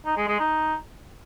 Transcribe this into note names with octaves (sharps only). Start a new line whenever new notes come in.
D#4
G#3
G#3
D#4